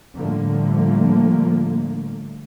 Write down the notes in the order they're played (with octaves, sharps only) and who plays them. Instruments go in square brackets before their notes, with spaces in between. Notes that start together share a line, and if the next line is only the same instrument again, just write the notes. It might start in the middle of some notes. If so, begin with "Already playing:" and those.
[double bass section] A2 D3 F3 G3 A3 A#3